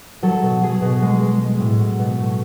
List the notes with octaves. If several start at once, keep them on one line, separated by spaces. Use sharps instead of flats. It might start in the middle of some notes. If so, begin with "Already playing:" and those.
F#3 A4
B2
F#3 G#4
B2
G#3
G#3
G#3
A2
F#3
B2
A3